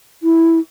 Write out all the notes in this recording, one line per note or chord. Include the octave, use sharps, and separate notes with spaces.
E4